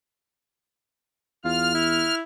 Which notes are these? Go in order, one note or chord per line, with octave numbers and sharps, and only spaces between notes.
E2 F4 F6
E4